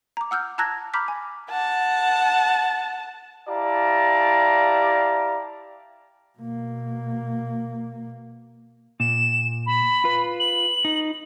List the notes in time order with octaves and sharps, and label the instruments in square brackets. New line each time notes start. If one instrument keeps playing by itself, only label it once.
[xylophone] A#5 D6
F#5 E6 F6 G6
A5 A#5 E6 F#6 G#6 A#6
A#5 B5 D6 F6 G6 B6
G#5
[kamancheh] F#5 A5
[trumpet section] E4 G4 D5 F5 A5 A#5
[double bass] B2 A#3
[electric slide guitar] A#2 [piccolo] E7
[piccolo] B5
[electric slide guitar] F4 B4
[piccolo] F#7
[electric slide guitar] D#4